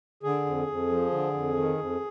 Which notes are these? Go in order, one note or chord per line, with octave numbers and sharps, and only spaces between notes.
D3 G#4
F2
F2
F3
D3
F2
D#3
F2